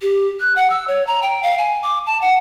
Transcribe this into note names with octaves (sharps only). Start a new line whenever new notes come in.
G4
F#6
F#5
E6
C#5
A#5
G5
F5
G#5
D6
A5
F#5